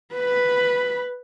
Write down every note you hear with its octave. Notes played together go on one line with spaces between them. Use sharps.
B4 B5